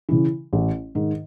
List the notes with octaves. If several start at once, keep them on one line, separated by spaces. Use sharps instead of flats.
C#3 E3
A1
G#2 D#3